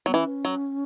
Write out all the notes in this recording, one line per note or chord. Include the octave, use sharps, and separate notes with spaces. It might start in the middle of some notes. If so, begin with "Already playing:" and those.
F#3 B3
E3 C#4
F#3